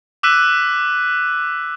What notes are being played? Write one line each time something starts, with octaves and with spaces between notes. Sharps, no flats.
D6 E6 F#6 B6 D#7